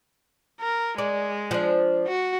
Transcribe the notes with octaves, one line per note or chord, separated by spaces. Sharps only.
A#4
G#3 D5
F3 D4
F#4